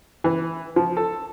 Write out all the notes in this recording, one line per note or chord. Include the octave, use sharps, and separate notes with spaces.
E3
F3
A4